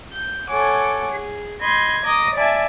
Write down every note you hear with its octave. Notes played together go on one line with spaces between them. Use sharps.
G6
A4 C#5 F#5 G#5 D6
G#4
D#5 B5 C6 G6 G#6
D#5 A#5 D6 D#6
D5 E5 G#5 A5